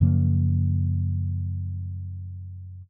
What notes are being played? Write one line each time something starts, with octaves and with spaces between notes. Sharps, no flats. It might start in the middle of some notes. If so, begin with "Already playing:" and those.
F#2 C#3 F3 A#3